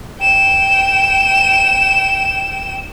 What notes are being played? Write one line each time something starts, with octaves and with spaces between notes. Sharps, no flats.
G5 E7